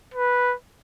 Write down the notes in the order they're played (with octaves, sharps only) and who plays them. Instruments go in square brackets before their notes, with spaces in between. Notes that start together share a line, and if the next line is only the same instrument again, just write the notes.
[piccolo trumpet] B4